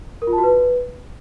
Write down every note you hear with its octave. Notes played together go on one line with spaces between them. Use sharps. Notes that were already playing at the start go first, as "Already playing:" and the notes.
A#4
F4
A5
F#4
B4